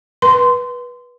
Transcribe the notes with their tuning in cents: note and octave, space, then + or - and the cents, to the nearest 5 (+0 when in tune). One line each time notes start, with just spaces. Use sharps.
B4 -20 C6 -20